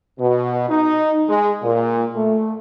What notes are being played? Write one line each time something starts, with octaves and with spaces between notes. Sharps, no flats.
B2
D#4
G#3
A#2
A3